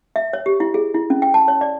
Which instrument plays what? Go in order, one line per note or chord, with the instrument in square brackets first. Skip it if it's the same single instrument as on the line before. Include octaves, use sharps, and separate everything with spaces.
[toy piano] E5
C#5
G4
E4
G#4
E4
C#4
G5
A5
C#5
D5